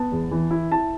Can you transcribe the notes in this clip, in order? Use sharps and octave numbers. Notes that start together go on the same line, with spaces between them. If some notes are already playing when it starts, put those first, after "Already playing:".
Already playing: B3 A5
E2
E3
E4
E4 A5